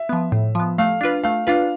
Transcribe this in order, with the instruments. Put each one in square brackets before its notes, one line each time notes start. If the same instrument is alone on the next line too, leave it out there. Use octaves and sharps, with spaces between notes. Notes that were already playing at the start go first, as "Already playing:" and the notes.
Already playing: [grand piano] E5
[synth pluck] F3 B3
A2
F3 B3
[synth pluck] A3 [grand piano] F5
[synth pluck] D4 F4 B4
[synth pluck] A3 [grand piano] F5
[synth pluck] D4 F4 B4 [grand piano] F5